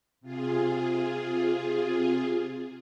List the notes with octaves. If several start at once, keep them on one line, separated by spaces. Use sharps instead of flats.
C3 F4 G#4